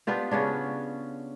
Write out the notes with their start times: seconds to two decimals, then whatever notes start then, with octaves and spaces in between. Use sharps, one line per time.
0.07 B3 D4 F4 G4
0.31 C#3 B3 C#4 D4